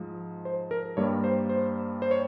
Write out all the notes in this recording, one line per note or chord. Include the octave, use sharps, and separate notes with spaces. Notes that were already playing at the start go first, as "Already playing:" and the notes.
Already playing: G#2 F3 G#3
C5
A#4
G2 G3 A#3 C#5
C5
C5
C5
C#5